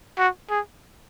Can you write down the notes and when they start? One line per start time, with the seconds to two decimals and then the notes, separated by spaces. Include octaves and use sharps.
0.18 F#4
0.50 G#4